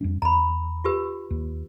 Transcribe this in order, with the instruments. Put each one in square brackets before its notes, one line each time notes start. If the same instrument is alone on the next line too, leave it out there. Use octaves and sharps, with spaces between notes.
[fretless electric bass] F2 G3 D4
[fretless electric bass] E2 [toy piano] A#5 B5
[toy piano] F4 G4 B4
[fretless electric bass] D#2